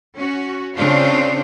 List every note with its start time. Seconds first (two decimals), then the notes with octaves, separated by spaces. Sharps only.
0.17 C#4 F#4
0.75 C#3 C4 D4 F4 C5